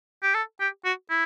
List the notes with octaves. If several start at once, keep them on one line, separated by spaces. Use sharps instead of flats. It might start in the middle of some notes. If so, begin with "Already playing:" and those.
G4
A4
G4
F#4
E4